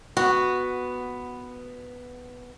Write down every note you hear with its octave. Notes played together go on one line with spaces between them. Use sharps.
B3 F#4